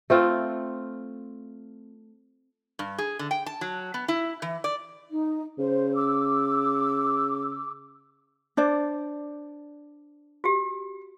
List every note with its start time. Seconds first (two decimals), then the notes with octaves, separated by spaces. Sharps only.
0.10 A3 C4 F4
2.79 G2
2.98 G#4
3.19 D3
3.31 G5
3.46 A5
3.61 F#3
3.94 B3
4.08 E4
4.42 E3
4.64 D5
5.10 D#4
5.58 C#3 C5
5.95 D6 E6
8.57 D4 C5 D5
10.44 F#4 G4